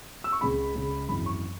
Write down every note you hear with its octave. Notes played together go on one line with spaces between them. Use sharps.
E6
C#6
C#2 C#3 G#3 C#4 B5
C#2 C#3 G#3 C#4
G#1 F#2 E3 B5
C#6